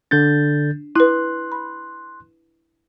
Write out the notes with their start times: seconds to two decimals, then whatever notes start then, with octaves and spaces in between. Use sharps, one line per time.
0.11 D3 D4 G6 A6
0.96 E4 B4 C6 F#6
1.52 B5